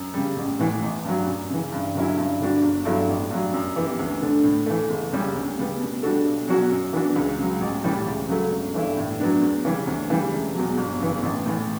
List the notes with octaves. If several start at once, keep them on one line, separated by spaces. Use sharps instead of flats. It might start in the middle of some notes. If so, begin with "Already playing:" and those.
Already playing: F#2
C#3 G3
A1
A2 E3
A1
G2 F#3
F#2
C#3 E3
G2
D3 F#3 C#4 E4
G2
D3 G3 D4 F#4
G1
G2 F#3 A3 E4
A1
G2 F#3
F#2
E3 B3 E4 G4
D2
D3 A3 D4
A2
E3 A3
F#1
F#2 C#3 G3 C#4
D2
C#3 G3 B3
B2
G3 D4 F#4 A4
B1
B2 F#3 C#4 F#4
F#2
E3 B3 D4 F#4
C#2
C#3 F#3
A1
A2 E3 G3 C#4
C#2
C#3 F#3 A3
G1
G2 E3 A3 E4
A2
F#3 B3 D4
E2
C#3 E3 G3 C#4
D2
C#3 E3 G3
E1
E2 B2 F#3
G1
F#2 C#3 E3 B3
A1
A2 E3